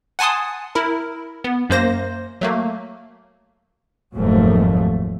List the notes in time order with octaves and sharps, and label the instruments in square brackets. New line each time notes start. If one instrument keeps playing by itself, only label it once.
[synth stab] F#5 G#5 A5 C6 D#6
E4 A#4
B3
F#2 A#3 C5 A#6
F#3 A3 A#3
[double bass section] F1 D#2 G#2 F3 F#3 A3